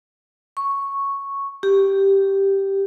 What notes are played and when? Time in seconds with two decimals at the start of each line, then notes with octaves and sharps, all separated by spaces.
0.57 C#6
1.63 G4